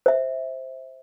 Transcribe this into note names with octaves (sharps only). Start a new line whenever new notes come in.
C5 E5